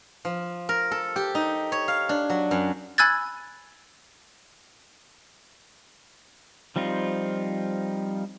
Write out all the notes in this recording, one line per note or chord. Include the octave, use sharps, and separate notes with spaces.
F3
A#4
A4
G4
D#4
C#5
F5
D4
F#3
F#2
G#5 B5 E6 F#6 G#6 A6
F3 G3 C4 D#4 F4